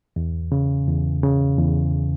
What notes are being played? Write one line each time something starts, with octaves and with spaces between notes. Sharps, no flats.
E2
C#3
E2
C#3
E2